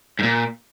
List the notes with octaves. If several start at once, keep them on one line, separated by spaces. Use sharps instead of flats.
G#2
A#2